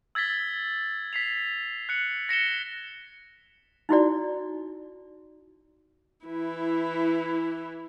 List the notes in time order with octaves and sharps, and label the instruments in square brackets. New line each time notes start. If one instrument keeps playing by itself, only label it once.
[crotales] E6 G#6 A6 B6 G7
B6 C7 F7
F#6 C#7 F#7
A#6 C#7 E7 G7
[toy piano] D#4 E4 F#4 D5
[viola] E3 E4